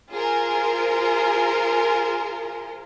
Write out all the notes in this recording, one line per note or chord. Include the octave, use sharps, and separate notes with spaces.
F4 G#4 A#4 C5